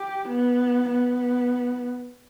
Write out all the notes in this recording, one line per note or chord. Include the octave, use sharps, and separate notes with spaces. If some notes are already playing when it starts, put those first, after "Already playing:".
Already playing: G4
B3
B3